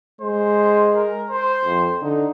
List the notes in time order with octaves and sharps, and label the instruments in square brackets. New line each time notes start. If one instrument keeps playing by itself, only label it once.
[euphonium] G#3 [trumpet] C5
[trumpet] A#4
C5
[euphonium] F2
[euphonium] D3 [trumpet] D#4